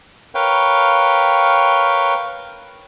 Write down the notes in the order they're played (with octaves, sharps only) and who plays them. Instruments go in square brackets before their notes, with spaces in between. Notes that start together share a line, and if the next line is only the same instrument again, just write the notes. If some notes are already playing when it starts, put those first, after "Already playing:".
[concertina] A#4 B4 C#5 F5 G5